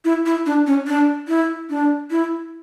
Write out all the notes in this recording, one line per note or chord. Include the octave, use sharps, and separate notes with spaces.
E4
E4
D4
C#4
D4
E4
D4
E4